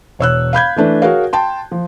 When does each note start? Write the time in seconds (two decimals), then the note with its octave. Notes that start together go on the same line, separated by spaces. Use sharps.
0.19 E1 C#5 E6 F#6
0.53 F5 B5 G6 G#6
0.76 E3 A3 D4 B4
1.02 F#4 G#4 A#4 C#5 F5
1.33 G5 A5 C6
1.72 F3